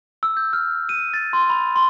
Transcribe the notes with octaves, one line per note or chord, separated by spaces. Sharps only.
E6
G6
F6
D#7
A6
C6
B5
C6